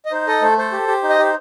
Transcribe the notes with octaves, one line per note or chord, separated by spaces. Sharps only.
D#5
D#4 C5
A4 D#5
A3 C5
A4 C5
G4
G4
D#4
D#5
G4 C5